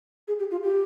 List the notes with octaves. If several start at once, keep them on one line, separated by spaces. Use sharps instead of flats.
G#4
G4
F4
G4